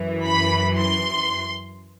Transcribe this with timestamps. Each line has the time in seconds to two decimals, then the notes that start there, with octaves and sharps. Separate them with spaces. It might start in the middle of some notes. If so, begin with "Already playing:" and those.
Already playing: F#2 E3
0.25 B5
0.77 C6